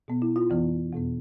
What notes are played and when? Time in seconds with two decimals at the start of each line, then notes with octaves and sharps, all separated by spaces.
0.08 B2 B3
0.22 E4
0.36 F4
0.50 F2 E3 B3
0.93 E2 B2 B3